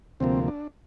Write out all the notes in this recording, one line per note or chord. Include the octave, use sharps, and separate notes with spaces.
D2 C3 F3 A#3 C4
D4